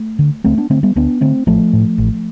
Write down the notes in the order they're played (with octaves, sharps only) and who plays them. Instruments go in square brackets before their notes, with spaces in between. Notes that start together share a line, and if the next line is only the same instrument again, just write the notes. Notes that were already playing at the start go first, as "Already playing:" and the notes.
Already playing: [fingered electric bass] A3
D3
D2 A3 C4
B3 D4
D3 A3 C4
G3 B3
D2 B3 D4
D3 A3 C4
A1 F3 A3
A2
A1